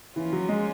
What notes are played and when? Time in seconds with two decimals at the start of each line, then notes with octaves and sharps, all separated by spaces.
0.16 E3 F3 A#3 C#4 F4
0.33 F#3
0.49 G#3